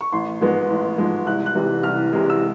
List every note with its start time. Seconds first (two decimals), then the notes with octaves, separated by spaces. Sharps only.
0.01 C#6
0.12 A1 C6
0.41 G#2 F3 G#3 B3
0.70 A1
0.98 G#2 F3 G#3 B3
1.26 C2 F#6
1.46 F#6
1.55 C3 E3 G#3
1.83 C2 F6
2.13 C3 E3 G#3
2.30 E6